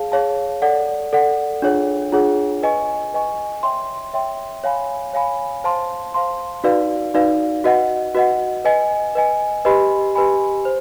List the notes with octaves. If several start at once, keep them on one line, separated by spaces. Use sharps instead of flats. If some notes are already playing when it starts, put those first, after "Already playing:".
Already playing: G#4 C#5 F5 A5
G#4 C#5 F5 A5
A4 D5 F#5
A4 D5 F#5
D4 F4 G#4 C#5 F#5
D4 F4 G#4 C#5 F#5
B4 D#5 G#5 C#6
B4 D#5 G#5 C#6
C#5 E5 G5 C6
C#5 E5 G5 C6
C#5 F5 G#5 B5
C#5 F5 G#5 B5
C5 F5 A5 C6
C5 F5 A5 C6
D#4 F#4 B4 D5 F5
D#4 F#4 B4 D5 F5
F#4 B4 D#5 F#5
F#4 B4 D#5 F#5
B4 D#5 G#5
B4 D#5 G#5
G4 B4 D#5 G#5 B5
G4 B4 D#5 G#5 B5
C5